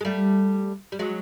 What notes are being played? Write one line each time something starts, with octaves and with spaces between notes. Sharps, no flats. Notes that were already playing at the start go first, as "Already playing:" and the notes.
G#3
G3 A3
G3
F#3 G#3